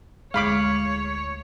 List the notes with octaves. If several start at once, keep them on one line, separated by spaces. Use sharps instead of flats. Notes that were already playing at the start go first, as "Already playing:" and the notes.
D2 G#3 E4 C#5 F5 B5 D6